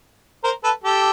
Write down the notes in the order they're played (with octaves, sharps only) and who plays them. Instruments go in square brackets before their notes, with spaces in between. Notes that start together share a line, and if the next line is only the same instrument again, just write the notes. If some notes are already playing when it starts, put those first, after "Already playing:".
[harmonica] A#4 C5
A4 B4
G4 A4